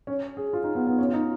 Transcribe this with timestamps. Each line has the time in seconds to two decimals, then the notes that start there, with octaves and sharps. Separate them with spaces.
0.07 C#4
0.37 G#4
0.53 F4
0.64 D#4
0.75 B3
0.87 B3
0.99 C#4
1.08 F4
1.13 D#4